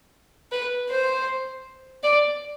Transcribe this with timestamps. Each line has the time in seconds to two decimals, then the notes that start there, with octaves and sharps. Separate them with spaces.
0.52 B4
0.90 C5
2.03 D5